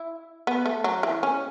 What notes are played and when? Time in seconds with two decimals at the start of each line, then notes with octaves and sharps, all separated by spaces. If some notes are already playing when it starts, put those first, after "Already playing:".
Already playing: E4
0.47 B3
0.66 A3
0.84 F#3
1.03 E3
1.23 C#4